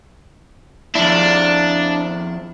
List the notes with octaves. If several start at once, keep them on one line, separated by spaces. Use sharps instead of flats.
F2 D4 E4